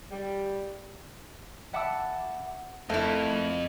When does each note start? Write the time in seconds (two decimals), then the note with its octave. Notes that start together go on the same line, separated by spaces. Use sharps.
0.11 G3
1.73 E5 F#5 A5 B5 D6 E6
2.90 F2 A3 A#3 E4